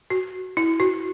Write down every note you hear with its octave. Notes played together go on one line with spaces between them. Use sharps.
F#4
E4
F#4